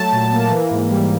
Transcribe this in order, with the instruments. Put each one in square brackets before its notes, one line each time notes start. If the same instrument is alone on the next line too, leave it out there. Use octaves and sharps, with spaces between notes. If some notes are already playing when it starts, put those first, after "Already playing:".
Already playing: [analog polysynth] F#3 A3 A5
A#2
A#3
E3
G#2
G3